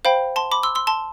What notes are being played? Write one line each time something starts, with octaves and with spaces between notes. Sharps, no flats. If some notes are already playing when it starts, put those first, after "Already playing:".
C5 F5 G5 B5
A5 C6
B5 D6
C6 E6
C6 E6
A5 C6